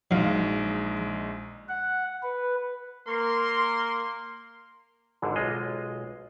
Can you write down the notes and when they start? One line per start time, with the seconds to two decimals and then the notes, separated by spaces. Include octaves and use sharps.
0.11 A#1 F#3 G#3 D#4 F5
1.69 F#5
2.23 B4
3.08 A#3 A#4 C6
5.22 G#1 G#2 D3
5.36 B1 G#3 F4 D#5